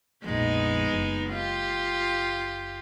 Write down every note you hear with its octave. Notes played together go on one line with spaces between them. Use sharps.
A#1 F2 G#3 B3 D#4
F#1
F4 G4